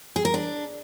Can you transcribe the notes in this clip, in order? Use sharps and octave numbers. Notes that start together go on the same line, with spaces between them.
G#4
A#4
D4